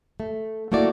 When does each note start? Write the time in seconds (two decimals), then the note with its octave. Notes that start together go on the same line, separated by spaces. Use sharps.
0.20 A3
0.72 A3 A#3 E4 F#4 D5